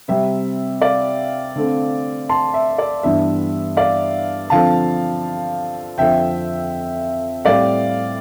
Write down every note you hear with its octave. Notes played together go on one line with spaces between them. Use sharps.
C3 G3 C4 E5
D5 F5
D3 A3 C4
A5 C6
E5
D5
G2 E3 B3 D4 E5
D5 F5
D3 F3 C4 F5 A5
F2 D3 F3 C4 E5 G5
A2 G3 C4 D5 F5